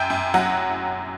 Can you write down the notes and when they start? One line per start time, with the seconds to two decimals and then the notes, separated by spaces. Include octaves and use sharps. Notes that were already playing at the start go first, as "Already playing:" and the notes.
Already playing: F#2 G5
0.10 F#2
0.34 F#3 F#5